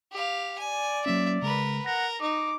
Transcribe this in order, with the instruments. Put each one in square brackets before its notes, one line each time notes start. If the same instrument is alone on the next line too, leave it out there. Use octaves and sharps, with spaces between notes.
[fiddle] G4 F5
[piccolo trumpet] D5 [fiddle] G#5
[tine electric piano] F#3 A#3 C#4 [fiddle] E5
[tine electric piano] C#3 G#3 [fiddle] A#4 B4
[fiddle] A#4 [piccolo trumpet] F#5 [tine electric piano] A#6
[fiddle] D#4 [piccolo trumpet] D6